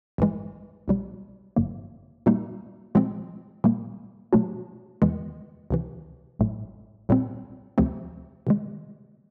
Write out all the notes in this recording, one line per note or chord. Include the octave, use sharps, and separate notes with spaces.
A1 G2 E3 G#3
B1 B2 G3
G#1 G2 D3 F#3 A#3
A#2 G3 A#3 D#4 F#4
A#2 F3 G#3 C4
A#2 G3 A#3
B2 F#3 A3 D4 F#4
E2 C3 E3 G#3 B3
C#2 C3 E3
A1 A2 F#3 A3
A#1 A#2 G3 C4
D2 C3 F3 A3 C4
C3 D#3 G#3